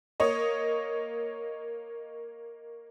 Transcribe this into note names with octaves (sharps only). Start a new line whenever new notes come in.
A#3 C#5 D#5